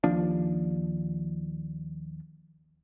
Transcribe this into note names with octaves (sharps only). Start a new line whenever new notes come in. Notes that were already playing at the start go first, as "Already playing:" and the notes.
D#2 F3 D4